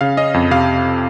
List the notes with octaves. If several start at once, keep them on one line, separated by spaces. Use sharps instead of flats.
C#3 F5
C#4 D#5
F2
C3 F5